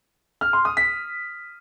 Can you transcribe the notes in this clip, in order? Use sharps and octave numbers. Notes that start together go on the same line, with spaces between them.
F6
C6
D#6
B6